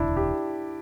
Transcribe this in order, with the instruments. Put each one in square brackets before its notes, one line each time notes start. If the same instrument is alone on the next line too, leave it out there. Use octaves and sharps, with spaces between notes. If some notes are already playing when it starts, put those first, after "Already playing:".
Already playing: [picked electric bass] E1 D2 C3 [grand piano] D4 E4
[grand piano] G4